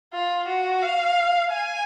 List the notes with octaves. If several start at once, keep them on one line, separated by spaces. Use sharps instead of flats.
F4
F#4
F5
G#5